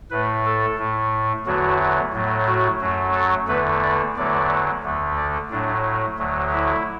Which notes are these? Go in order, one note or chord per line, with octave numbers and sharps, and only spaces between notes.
A2 A3 B4
A4
A2 A3
E2 D3 F#3 A3 F#4
A2 F#3 A3
F#4
F#2 F#3 A3
A4
E2 D3 A3 B4
D5
E2 D3 F#3 A3 D5
D2 D3 A3
D5
A2 F#3 A3 D4
D2 D3 F#3 A3
E4